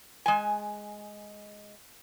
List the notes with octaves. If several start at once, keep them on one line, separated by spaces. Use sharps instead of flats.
G#3 G#5